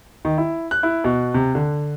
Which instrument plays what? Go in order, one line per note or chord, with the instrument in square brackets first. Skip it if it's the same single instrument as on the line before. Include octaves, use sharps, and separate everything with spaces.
[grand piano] D#3
E4
F#6
E4
B2
C3
D3